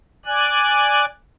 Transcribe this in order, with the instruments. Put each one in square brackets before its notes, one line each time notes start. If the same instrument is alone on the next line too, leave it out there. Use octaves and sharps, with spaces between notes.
[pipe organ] D5 G#5 F#6